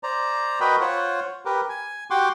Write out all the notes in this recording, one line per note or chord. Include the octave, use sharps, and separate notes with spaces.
C5 D5 A#5
F#4 A#4 B4 D#5 G5 B5
F4 C5 C#5 F#5
G4 A#4 B4
G#5
F#4 G4 F#5 G5 C6 D6